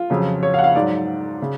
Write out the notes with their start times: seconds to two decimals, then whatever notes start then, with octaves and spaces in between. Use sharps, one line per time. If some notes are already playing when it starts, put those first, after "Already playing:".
Already playing: F4
0.10 F2 C#3 F#3
0.43 C#5
0.54 F5
0.59 F#5
0.64 F5
0.75 G#2 F#3 D5
1.42 C#3